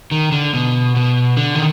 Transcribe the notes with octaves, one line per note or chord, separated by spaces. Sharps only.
D#3
D3
B2
B2
D3
D#3